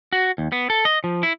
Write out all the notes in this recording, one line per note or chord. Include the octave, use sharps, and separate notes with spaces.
F#4
D#2
B3
A4
D#5
F3
E4